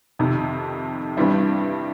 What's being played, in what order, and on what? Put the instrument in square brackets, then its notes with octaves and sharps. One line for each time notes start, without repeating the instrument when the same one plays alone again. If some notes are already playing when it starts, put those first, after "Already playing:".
[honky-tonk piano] F2 C3 D#3
G2 E3 G3 C4 E4